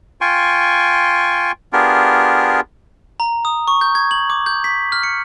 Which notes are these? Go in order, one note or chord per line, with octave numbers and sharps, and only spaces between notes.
F4 G5 G#5 C6 C#6
B3 D4 F4 G4 G#4 A#4
A#5
D#6
C#6
G6
G#6
F#7
D6
G6
B6
F6
C#7